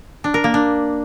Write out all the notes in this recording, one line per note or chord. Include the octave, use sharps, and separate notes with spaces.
D4
A#4
A#3
D4